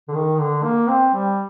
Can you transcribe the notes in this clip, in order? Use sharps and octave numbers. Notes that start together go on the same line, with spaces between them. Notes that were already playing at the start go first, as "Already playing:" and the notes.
D3
D#3
D3
A#3
C4
G3